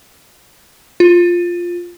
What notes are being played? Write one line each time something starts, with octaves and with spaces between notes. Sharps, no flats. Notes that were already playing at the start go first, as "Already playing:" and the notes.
F4